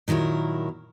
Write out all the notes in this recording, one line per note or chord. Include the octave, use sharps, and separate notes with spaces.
A#2 D#3 F#3 E4 A#4